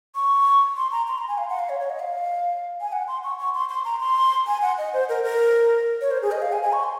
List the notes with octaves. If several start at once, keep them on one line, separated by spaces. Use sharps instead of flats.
C#6
C6
A#5
C6
A#5
G#5
F5
F#5
F5
C#5
C#5
D#5
F5
G#5
F#5
C6
C#6
C#6
C6
C6
A#5
C6
G#5
F#5
D#5
C5
A#4
A#4
C#5
C5
G#4
D#5
F5
G#5
G#5
C#6
C6